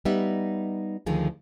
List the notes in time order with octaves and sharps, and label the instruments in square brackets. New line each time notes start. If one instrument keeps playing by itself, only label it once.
[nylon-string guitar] G3 B3 D#4 E5
D2 D3 D#3 F3 G#4